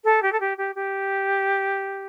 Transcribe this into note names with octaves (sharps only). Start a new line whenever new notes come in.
A4
G4
A4
G4
G4
G4